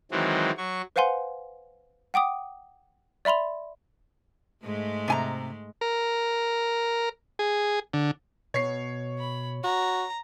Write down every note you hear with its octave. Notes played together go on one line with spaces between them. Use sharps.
D#3 E3 F#3 G#3 C4
F#3 C#6
B4 C5 F5 F#5 G#5 C6
F#5 G5 D6 D#6
D5 E5 B5 C6 F7
G#2 G#3 A3
C3 G#5 A#5
A#4
G#4
D3
B2 C#5 C7
B5
F#4 A#5